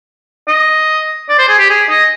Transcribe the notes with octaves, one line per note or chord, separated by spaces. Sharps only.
D#5
D5
C5
G#4
G4
G#4
D#5